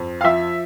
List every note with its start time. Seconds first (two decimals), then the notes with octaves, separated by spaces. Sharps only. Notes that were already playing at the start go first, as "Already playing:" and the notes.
Already playing: F2
0.21 F5
0.24 F3 E5